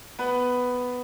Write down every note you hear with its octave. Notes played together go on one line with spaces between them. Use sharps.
B3 B4